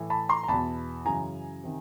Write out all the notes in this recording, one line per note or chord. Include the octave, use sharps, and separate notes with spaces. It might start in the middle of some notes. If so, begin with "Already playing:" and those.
Already playing: A2 E3
A5 B5
A#5 C6
A#5
E2 B2 A5 B5
F#2 C#3 E3 G#5 A#5
C3 D#3